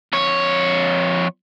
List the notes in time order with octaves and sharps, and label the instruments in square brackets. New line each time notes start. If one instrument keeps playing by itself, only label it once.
[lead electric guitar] F2 C#5